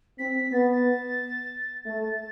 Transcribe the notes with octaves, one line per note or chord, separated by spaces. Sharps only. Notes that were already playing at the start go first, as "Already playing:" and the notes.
C4 B6
B3 A6
A3 A6